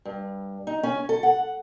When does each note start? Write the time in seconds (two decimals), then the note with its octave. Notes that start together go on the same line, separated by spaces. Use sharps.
0.05 G2
0.67 D#4
0.83 C#4
1.09 A4
1.23 F#5